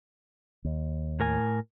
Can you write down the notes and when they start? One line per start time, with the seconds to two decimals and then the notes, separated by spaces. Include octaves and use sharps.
0.65 D#2
1.20 A2 A#4 G#5